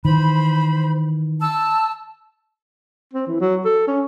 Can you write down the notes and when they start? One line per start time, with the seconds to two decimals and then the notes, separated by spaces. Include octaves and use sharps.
0.05 D#3 E3 C5 B5
1.40 A5 E6
3.13 C4
3.27 E3
3.40 F#3
3.65 A4
3.87 C#4